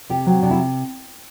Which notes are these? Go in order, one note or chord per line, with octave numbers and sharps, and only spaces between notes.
C3 G4
F#3 C4
C3 D4
E4